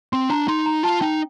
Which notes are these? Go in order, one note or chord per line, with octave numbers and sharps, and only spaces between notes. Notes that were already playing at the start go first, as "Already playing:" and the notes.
C4 C6
D4 A#5
D#4 C6
A#5
F4 A5
D#4 G5